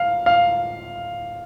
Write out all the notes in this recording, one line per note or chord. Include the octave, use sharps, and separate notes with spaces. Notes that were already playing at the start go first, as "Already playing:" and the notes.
Already playing: F5
F5